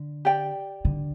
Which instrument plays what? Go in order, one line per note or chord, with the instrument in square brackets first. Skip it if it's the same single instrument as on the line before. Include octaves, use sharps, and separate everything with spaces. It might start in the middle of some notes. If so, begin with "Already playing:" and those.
Already playing: [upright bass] D3
[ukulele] G4 D5 G5
[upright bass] D3